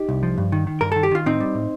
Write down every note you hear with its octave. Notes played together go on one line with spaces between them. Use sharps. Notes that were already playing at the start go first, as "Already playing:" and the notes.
Already playing: D#4 G4
C2
F3
G2
D#3
D#3
G2 A#4
D#3 A4
G4
D#3 F4
A2 C4 D#4
G3
A2